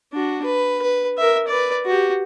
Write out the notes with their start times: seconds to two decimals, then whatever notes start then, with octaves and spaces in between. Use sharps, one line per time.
0.13 D4 F#4
0.44 B4
0.82 B4
1.18 A#4 E5
1.48 B4 D5
1.85 F#4 G4